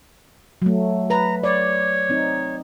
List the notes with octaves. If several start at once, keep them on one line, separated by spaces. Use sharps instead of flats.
F#3 A3
B4 A#5
C#5 D5
C4 D#4